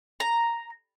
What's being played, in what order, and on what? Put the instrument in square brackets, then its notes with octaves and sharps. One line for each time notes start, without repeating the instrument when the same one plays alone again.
[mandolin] A#5